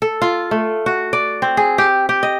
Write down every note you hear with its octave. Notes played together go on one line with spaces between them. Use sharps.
A4
F4
A3
F#4
D5
C4
G#4
G4
G4
D#5